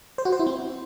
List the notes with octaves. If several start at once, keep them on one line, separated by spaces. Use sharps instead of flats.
C5
F#4
C5
E4
C4